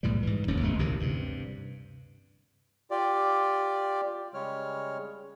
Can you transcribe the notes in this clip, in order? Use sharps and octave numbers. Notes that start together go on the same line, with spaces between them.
B1 A2 E3 G3
G#2 E3
E1 D#2 G#2 C#4
G1 D2 G#3 A3
A1 D2 C3 D#3
G2 C3
F4 G4 D5
C#3 G3 G#3 C#5 F6